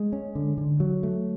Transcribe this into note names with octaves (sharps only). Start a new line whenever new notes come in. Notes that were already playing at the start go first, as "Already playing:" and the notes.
Already playing: G#3
C#4
D3
D3
F#3
A3